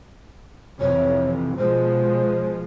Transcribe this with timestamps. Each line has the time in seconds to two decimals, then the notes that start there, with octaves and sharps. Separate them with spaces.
0.80 F2 C3 E3 C#5
1.59 B2 F3 G#3 C5